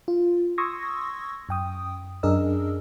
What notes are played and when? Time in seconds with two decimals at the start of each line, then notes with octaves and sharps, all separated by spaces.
0.08 F4
0.58 C6 C#6 D#6 E6 G#6 A#6
1.49 F#2 G5 D#6
2.23 F#2 D4 G#4 A#4 D#5 E6